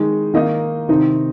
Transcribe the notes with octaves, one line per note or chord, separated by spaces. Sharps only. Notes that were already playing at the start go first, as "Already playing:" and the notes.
Already playing: D#3 G#3 D#4
D#3 A#3 D#4 D#5
C3 D#3 C4 D#4